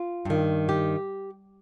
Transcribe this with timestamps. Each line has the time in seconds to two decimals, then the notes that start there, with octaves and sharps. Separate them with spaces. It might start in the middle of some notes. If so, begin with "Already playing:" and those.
Already playing: F4
0.25 G2 D#3
0.69 G4